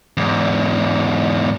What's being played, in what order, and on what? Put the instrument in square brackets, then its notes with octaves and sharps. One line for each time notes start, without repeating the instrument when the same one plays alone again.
[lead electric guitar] E2 G#2